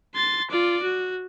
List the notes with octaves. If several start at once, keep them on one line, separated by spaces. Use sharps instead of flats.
C6 A6
F4 D5
F#4